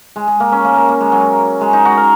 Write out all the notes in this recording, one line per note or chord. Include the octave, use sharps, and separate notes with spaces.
G#3
G#3
A#3
C#4
A#3
A#3
A#3
G#3
F#3
G#3
D#4
F#4
A#4